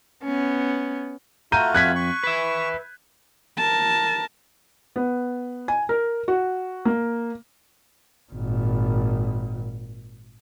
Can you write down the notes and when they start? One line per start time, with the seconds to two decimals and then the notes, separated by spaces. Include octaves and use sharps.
0.23 B3 C#4
1.52 A3 F4 F#4 A#5 G6 D#7
1.75 F2 F#6 G#6 B6
1.96 C#6
2.24 B4 E5
3.57 A#4 A5
4.96 B3
5.68 G#5
5.89 A#4
6.28 F#4
6.85 A#3
8.32 G#1 A#2